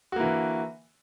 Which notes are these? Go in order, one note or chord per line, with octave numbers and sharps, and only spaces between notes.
D3 E3 A#3 F#4